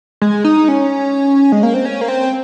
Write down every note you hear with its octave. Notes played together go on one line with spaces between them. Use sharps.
G#3
D#4
C#4
G#3
A#3
C4
C#4
A#3
C4